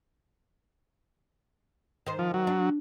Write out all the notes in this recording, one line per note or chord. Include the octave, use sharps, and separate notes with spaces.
D#3 C5
F3
F#3
D4